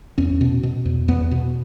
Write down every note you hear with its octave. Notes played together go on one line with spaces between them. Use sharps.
E2 C#4
B2
B2
E2
E2 B3
B2